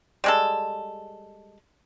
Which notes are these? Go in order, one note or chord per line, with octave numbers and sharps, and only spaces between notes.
G3 G#3 A4